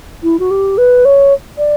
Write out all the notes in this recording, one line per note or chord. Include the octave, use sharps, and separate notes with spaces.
E4
F#4
G4
B4
C#5
D5